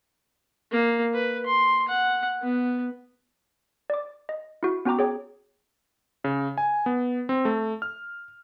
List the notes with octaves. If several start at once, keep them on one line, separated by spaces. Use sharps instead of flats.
A#3
B4
C6
F#5
B3
D5 D6
D#5
E4 F#4
B3 C#4 F#4 G5 A#5 D6
G#4 C#5 G5 D6
C#3
G#5
B3
C4
A3
F6